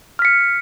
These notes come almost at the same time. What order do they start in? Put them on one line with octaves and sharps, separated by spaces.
F6 B6 C#7